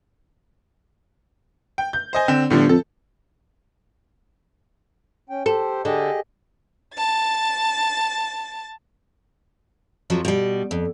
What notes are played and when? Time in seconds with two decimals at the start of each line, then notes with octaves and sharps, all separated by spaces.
1.78 G5
1.93 G6
2.13 C5 D#5 G#5
2.28 D3 C4
2.50 G1 A2 D3 F3
2.69 F2 A4
5.29 C#4 G5
5.46 G4 A4 C5
5.85 D3 G4 G#4 D#5
6.95 A5 A6
10.10 F2 F3 F#3
10.25 B2 G3
10.71 F2